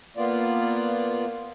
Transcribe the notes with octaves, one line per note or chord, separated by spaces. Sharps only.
A#3 B3 F4 D5